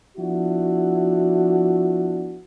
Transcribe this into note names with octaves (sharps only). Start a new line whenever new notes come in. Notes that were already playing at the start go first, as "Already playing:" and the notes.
F3 B3 D4 E4 F#4